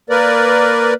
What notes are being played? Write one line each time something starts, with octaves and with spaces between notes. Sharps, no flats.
A#3 A#4 B4 D5